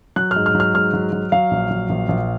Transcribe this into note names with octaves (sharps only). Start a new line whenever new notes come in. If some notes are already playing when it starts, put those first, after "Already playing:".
F#3 F#6
F6
G#2
F6
F#3
F6
G#2 F6
F#3
F#3
F#3 F5
A#1
F#3
A#1
A#1